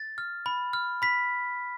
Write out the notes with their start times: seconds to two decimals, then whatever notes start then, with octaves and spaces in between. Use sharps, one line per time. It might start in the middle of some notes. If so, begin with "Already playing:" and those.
Already playing: A6
0.18 F6
0.46 B5
0.73 F6
1.02 B5 B6